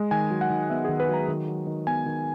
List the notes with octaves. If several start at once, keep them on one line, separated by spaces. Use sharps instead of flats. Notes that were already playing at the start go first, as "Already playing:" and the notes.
Already playing: G#3
D#3 G#5
F#3
F#5
D#3
B3 E5
G#4
D#3
B4
F#3 A#5
D#3
F#3
D#3
B3 G#5
D#3